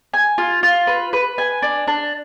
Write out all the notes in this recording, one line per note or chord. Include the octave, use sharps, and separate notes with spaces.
G#5
F4
F4
B4
B4
G#5
D4
D4